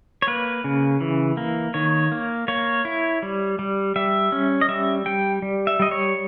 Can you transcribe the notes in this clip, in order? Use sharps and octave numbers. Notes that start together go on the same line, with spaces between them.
C#5
A#3 B4
C#3
E3
A#3
D#3 C#5
A#3
A#3 C#5
E4
G3
G3
G3 E5
C#4
D#5
G3 E5
G3 G5
G3
E5
G3 D#5
C#5